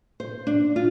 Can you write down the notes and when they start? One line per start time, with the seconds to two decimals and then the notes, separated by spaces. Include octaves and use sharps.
0.20 C5
0.47 D4
0.76 F4